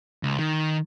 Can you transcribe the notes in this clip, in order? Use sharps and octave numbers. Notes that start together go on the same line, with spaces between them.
C#2
D#3